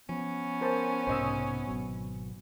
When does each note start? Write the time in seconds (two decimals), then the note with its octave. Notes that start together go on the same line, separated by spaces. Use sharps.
0.09 F3 B3 C#4
0.61 A#4 C5 A5
1.07 B1 G#2 C3 C5 D#5 E6
1.67 G#1 B2 F#3